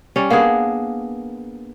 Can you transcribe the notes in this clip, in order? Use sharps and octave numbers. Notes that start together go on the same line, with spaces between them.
G3 C#4
A#3 B3 D4 G#4